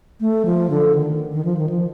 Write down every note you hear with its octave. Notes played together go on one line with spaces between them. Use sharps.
A3
F3
D3
D#3
D#3
F3
D#3
F3